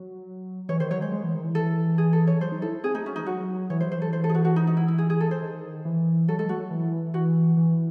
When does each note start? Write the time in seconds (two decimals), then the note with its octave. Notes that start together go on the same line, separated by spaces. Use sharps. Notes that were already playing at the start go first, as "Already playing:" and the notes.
Already playing: F#3
0.69 E3 C#5
0.80 D#3 C5
0.91 F#3 C#5
1.01 G#3 C5
1.12 G#3
1.24 E3
1.34 D#3
1.44 E3
1.55 A4
1.98 G#4
2.13 A4
2.27 C#5
2.41 F#3 C5
2.52 D#4
2.62 E4 A4
2.84 C4 G#4
2.95 A3 D#4
3.05 F#3 C#4
3.16 E3 D#4
3.21 G#3
3.26 F#3 F#4
3.70 E3 C#5
3.81 F#3 C5
3.92 E3 C5
4.02 A4
4.13 C5
4.24 A4
4.29 G#4
4.35 F#4
4.45 F#4
4.56 D#4
4.67 D#4
4.77 E4
4.88 E4
4.98 G#4
5.10 G#4
5.21 A4
5.31 C5
5.42 D#3
5.85 E3
6.28 F#3 A4
6.38 G#3 A4
6.49 A3 F#4
6.60 F#3
6.71 E3
7.14 E3 F#4
7.57 E3